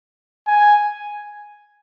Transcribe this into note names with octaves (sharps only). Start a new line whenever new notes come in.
G#5